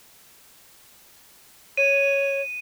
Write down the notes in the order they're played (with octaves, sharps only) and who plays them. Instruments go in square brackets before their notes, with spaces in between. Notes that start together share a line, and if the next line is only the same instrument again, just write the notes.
[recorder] C#5 [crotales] D#7